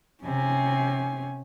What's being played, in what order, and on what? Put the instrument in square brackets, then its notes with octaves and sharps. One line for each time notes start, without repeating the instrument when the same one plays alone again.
[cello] C3 [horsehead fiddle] C#4 G#5